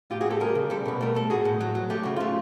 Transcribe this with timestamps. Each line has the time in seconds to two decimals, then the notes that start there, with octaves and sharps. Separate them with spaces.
0.10 A2 F4 G4
0.21 F#4 G#4
0.26 A3 G4 A4
0.40 G3 G#4 A#4
0.55 C#3
0.70 G3 G4 A4
0.86 B2 B4
1.01 A3 A#4
1.15 A3 A4
1.30 A2 F#4 G#4
1.45 A2
1.61 F#3
1.75 F#3
1.90 A3 G4
2.03 C#3 F#4
2.16 A3 F4